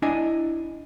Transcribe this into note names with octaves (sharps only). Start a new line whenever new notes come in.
D4 E4 D5 D#5 G#5